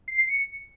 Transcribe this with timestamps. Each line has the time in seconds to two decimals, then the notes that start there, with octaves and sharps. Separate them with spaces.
0.08 C7
0.18 C7
0.29 C#7